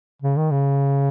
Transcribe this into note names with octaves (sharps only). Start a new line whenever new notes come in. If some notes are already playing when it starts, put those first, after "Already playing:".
C#3
D#3
C#3